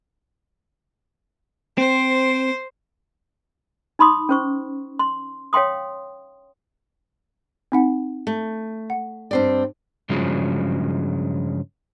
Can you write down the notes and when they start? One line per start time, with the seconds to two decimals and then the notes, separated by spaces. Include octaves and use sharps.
1.78 C4 C5
3.99 D#4 B5 C6 D#6
4.29 C#4 C5 C#6
4.99 C6
5.53 C#5 F5 G5 C6 D#6
7.72 C4 D#4 F#5
8.27 A3
8.90 F#5
9.31 G2 C4 D5
10.10 G2 C#3 F3 F#3 G#3